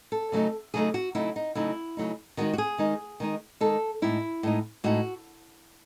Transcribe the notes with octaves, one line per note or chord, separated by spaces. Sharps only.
A4
C#3 F#3 A3 D#4
C#3 F#3 A3 D#4 G#4
F#4
C#3 F#3 A3 D#4 E4
D#4
C#3 F#3 A3 D#4 E4
C#3 F#3 A3 D#4
D#3 G#3 D#4 F#4
F#4
G#4
D#3 G#3 D#4
D#3 G#3 D#4
D#3 G#3 D#4 A4
A2 G#3 D#4 E4
A2 G#3 D#4
A2 G#3 D#4 F#4